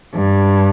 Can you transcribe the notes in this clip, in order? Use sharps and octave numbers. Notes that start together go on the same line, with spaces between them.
G2